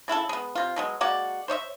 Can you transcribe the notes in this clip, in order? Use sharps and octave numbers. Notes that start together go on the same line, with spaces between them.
C#3 E4 F4 A4
G#3 B3
C3 F4
B2 F#3 G#3
G#3 A#3 F#4 D5
C5 C#5 D#5 E5